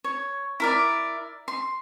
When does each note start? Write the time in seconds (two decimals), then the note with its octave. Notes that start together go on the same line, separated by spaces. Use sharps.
0.04 C#5
0.60 E4 A#4 D5
1.48 C6